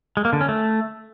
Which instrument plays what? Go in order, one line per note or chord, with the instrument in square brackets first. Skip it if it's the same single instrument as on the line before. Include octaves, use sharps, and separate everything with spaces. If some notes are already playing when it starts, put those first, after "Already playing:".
[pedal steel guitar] G#3
A#3
D3
C#4
A3